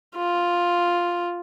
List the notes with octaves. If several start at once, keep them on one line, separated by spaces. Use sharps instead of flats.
F4